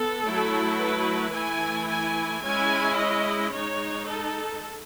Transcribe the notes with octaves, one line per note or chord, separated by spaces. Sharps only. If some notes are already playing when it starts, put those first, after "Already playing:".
Already playing: B3 A4
F#3 A3 E4
B4
E3 A3 E4 G#5
G#5
G#3 C#4 E4 G#5
D#5
G#3 D#4 C#5
A4